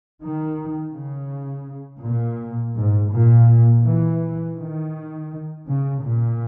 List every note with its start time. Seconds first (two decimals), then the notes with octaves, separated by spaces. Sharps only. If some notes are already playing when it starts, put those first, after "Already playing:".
0.24 D#3
0.97 C#3
2.05 A#2
2.77 G#2
3.14 A#2
3.86 E3
4.59 D#3
5.68 C#3
6.04 A#2